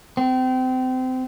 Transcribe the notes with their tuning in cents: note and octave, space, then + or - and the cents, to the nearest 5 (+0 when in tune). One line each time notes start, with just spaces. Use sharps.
C4 -30